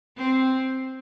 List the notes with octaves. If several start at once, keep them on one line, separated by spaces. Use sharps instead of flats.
C4